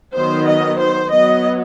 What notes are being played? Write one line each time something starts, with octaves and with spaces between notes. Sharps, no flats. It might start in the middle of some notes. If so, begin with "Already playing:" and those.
D#3 F#3 B3 C5
D#5
C5
F#3 B3 D#5